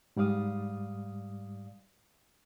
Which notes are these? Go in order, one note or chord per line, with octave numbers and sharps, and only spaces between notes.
G#2 G3 D5 F5 D#6